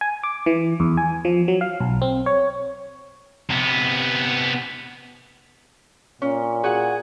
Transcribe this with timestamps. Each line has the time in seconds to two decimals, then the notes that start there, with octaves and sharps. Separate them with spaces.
0.01 G#5
0.23 D6
0.46 E3
0.80 E2
0.97 G#5
1.25 F3
1.48 F#3
1.61 F5
1.80 B1
2.02 C4
2.26 C#5
3.50 C3 B3
6.22 A#2 C#4
6.64 F#4 G#4 F#5